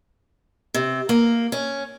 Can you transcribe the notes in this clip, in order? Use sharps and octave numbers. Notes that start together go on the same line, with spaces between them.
C3
A#3
C#4